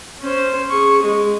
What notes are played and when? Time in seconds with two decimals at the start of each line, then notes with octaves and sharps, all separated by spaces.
0.21 C#4 C5
0.70 G#4 C#6
1.03 G#3